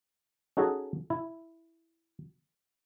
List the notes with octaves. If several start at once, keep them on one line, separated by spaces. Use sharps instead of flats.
C#4 D#4 F#4 G#4 A4 D#5
E4